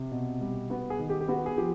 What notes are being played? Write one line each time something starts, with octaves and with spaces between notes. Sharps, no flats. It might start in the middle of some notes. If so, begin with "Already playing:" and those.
Already playing: C3
B2
G3
B3 F#4
G#4
D#3
G4
G4
B3 F#4
G#4
F3 G4